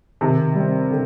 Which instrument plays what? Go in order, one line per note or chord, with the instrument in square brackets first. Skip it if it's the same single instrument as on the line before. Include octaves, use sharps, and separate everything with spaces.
[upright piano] C3 [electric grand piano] D#3
[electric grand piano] G3 C4
[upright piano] D3